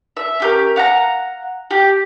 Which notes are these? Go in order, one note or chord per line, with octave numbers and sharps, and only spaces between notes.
E5
C#4 G4 A#4
F5 F#5 A5 A#5
G4